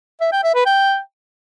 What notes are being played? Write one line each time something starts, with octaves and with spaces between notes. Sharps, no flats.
E5
G5
E5
B4
G5